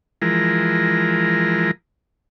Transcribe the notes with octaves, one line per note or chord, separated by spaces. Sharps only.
E3 F3 G#3 A#4